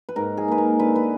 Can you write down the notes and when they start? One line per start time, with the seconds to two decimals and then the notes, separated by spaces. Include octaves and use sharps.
0.09 B4
0.16 G#2 A#4
0.37 G#4
0.48 A#3 B4
0.58 A#4
0.79 D3 B4
0.95 B4